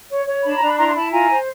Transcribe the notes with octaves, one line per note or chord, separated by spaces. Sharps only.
C#5
C#5
D4 A5 B5
A#5
D4
B5
E4 A#5 C6
C6
E4 A5 B5
F4 G#5 A#5
C5